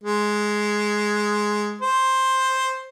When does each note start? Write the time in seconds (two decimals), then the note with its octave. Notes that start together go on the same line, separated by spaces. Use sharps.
0.04 G#3
1.82 C5